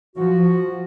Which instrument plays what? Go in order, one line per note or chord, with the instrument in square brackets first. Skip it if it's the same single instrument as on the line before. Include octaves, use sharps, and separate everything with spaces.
[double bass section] F3 [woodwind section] F#4